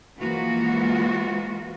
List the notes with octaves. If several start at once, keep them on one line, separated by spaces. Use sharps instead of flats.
E3 F3 G#3 A#3 F4 F#4